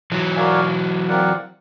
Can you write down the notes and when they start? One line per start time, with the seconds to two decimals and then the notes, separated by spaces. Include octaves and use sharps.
0.12 E3 F#3
0.36 F#4 A#4 D5 F5 G#5
1.08 C4 F4 A#4 D5 F#5